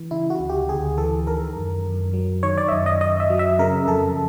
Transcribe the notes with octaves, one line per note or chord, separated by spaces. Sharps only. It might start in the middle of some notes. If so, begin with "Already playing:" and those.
Already playing: E3
C#3 E4
F#4
D2
G4
D2 G#4
E3 A4
D#3 A#4
F#2
F#2
F#3
D#3 C#5
D5
E5
F#2 D#5
D#5
F#2 D#5
E5
F#3
E5
C#3 A#4
F2 A4